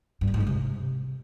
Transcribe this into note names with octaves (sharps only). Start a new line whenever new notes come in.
G2
E2
G#2
G#3
C3